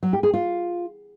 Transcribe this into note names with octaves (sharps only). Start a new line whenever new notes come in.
F#3
G4
G#4
F4